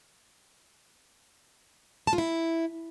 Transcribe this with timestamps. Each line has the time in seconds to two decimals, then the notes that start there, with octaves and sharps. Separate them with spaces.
2.07 A5
2.13 F4
2.18 E4